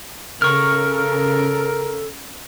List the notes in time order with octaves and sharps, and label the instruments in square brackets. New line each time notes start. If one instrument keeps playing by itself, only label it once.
[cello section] C#3 [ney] A4 [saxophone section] A#4 [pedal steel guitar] C#6 F6